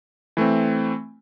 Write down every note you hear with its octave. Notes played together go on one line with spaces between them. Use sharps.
E3 A3 C4